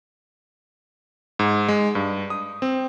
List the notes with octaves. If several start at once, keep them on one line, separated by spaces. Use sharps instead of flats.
G#2
G#3
G2
D#6
C4